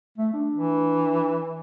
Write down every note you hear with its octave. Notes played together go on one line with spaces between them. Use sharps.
A3
D4
E3